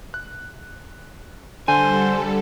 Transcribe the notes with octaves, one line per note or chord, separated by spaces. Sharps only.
F#6
D3 G3 A4 C5 G#5